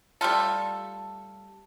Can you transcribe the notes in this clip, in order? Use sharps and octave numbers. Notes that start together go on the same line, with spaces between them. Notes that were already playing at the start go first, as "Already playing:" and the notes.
G3 A3 F4 A4